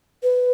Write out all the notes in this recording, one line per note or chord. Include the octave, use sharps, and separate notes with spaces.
B4